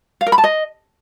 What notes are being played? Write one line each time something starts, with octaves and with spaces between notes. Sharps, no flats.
F5
A#4
B5
A5
D#5